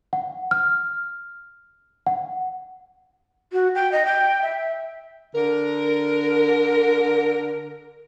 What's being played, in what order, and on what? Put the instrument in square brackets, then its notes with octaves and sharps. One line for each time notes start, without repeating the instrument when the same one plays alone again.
[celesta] F#5
F6
F#5
[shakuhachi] F#4
G5
D#5
G5
E5
[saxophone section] D3 A#4